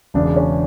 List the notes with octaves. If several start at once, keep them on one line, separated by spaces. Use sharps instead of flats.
E1 E2 C#3 D4
C#4